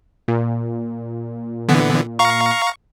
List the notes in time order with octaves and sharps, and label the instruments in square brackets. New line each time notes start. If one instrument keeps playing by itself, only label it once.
[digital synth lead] A#2
[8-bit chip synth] D3 E3 B3
F5 A#5 C#6